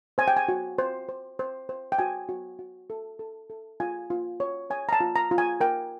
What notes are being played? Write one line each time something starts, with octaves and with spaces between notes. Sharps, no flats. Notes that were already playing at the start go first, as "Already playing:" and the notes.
C5 G#5
G5
G#5
F#4
C5
C5
C5
C5
G5
F#4 G#5
F#4
F#4
A4
A4
A4
F4 G#5
F4
C#5
C#5 G#5
A#5
A5
F4
A#5
F4
G#5
A#4 G5